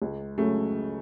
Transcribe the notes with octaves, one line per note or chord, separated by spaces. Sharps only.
C#2
C#3 F#3 A3